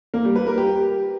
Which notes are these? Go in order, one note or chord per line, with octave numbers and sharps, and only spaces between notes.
A#3
G3
B4
A#4
G4